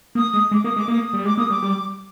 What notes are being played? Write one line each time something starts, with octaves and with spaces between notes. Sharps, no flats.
A#3 D#6
G#3
G#3 D6
A#3 D#6
G#3 D6
A#3 D#6
G3
G#3 D6
A#3 D#6
G3 D6
G3